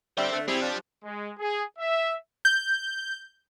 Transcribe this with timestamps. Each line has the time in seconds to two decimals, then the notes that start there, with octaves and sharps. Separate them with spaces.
0.18 D3 G3 C4 C5 E5
0.33 D3 A3
0.48 G3 C4 E4 G4 G#4 C5
0.61 F3 D4
1.04 G#3
1.38 G#4
1.78 E5
2.45 G6